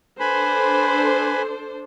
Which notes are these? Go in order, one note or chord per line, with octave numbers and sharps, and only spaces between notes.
D4 A4 B4 C5 G#5 B5